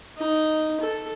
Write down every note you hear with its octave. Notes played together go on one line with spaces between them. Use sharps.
D#4
A4